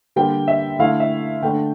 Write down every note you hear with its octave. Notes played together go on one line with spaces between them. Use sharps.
D3 G3 A#3 G5
E5
D3 A3 E4 F5
E5
D3 A3 D4 G5